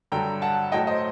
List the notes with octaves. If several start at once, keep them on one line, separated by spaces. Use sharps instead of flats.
G2 D3 F#3 G5 A#5
F#5 A5
A2 F#3 D#5 G5
C5 D#5